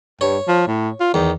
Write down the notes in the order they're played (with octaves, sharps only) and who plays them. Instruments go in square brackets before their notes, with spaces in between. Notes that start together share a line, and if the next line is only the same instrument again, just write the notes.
[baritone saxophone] G2 [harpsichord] C#5
[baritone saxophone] F3
A2
F4
[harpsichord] E2 [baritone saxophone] D#3